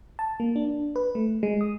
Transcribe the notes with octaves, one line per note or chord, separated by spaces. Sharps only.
A5
A#3
D4
B4
A3
G#3
D#6